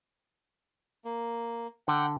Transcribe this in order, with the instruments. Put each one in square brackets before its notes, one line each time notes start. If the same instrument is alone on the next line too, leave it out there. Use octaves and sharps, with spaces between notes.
[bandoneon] A#3
[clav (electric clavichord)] D3 [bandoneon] F#5 G5